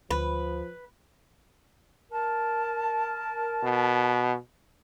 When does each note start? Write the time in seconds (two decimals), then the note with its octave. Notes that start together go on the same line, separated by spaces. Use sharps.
0.11 D2 F3 B4
2.12 A#4 A5
3.64 B2